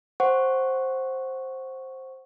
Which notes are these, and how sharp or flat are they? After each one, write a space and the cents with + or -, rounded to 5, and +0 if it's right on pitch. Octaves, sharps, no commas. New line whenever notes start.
C5 +10 F#5 +5 C#6 +0